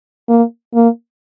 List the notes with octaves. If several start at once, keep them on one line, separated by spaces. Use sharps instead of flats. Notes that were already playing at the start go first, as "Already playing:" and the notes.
A#3
A#3